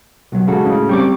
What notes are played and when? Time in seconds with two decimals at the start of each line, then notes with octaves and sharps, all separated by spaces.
0.32 B1 F#3
0.47 C#3 G#3 F#4 A4
0.66 A2 C#3
0.89 G3 C4 G5 C#6 D6